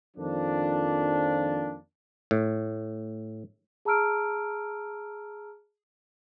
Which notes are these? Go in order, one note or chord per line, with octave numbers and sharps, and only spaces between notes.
F2 D#3 F3 A#3 D4
A2
G#4 A5 A#5 E6 F6 D7